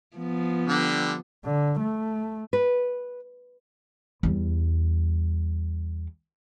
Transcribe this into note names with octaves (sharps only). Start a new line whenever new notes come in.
F3 B3
D3 G3
D3
A3
B4
E2 G3